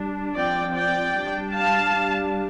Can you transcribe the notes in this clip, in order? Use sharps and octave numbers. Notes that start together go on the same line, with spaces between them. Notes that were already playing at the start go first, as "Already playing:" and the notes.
Already playing: G3 D4
F3 C4 D5 G5
D5 G5
G3 D4
F5 A5
G3 D4